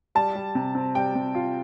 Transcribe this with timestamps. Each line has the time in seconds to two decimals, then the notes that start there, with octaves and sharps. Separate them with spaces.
0.15 G3 A5
0.35 G3
0.55 C3
0.75 C4
0.95 G3 G5
1.15 C3
1.35 F4